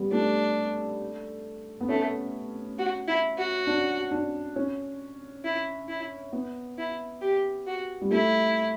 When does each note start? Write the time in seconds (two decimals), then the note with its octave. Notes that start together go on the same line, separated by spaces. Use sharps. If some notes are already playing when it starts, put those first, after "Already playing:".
Already playing: G3 B3
0.11 A3 D4
1.81 B3
1.89 A3 C#4
2.78 F#4
3.07 E4
3.38 F#4
3.67 D4
4.11 D4
4.56 C#4
5.44 E4
5.89 E4
6.33 B3
6.78 E4
7.21 G4
7.67 F#4
8.01 G3
8.11 A3 E4